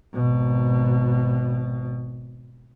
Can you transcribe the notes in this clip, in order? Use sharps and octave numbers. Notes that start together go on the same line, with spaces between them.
G#1 B2